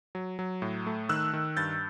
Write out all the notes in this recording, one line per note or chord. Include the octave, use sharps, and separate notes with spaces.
F#3
F#3
A2
A3
D#3 E6 F#6
D#3
G2 G6 A6